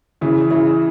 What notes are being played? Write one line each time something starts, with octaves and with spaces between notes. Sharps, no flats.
C#3 E3
C#3 E3